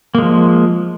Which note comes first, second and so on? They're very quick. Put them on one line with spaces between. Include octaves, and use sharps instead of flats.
A#3 G#3 F3